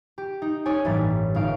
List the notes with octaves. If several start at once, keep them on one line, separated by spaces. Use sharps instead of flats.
G4
D#4
C#4 D#4 A4 C#5 D5 G#5
A1 G2 E3 G3 A#3 A6
G1 D#4 F5 D7